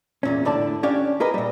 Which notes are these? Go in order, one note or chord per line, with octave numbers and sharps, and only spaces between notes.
E2 A#2 C#4
A2 D3 D5 A5
C#4 D4 G4 C#5 D5 F5
A#3 G#4 A#4 B4 D#5
A#2 G3